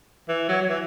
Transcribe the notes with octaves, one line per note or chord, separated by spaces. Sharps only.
E3
F#3
F#3
E3